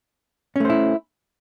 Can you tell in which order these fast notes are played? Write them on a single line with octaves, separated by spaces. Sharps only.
C#4 A3 C5 E4